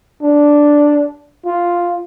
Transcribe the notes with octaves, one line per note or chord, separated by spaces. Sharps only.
D4
F4